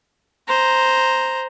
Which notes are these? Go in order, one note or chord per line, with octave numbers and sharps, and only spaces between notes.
C5 A#5